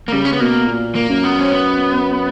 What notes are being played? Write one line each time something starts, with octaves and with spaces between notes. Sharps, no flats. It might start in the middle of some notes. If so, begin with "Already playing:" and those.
A#3
C#3 G3
C#4
B3
B2 A#3
A#2
A#3
F#2
B3
C#4
B3